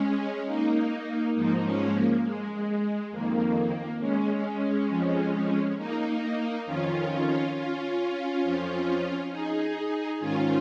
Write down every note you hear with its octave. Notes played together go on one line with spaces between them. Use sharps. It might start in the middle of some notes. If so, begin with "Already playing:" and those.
Already playing: G#3 C#4
A#3 D#4
G#2 F3 A#3 D#4
G#3 C#4
A#3
G#3
F2 D#3 A#3
G#3 C#4
F2 F3
A#3 D#4
F2 D#3 C#4 F4
C#4 F4
F2 F3
D#4 G#4
G#2 D#3 C#4 F4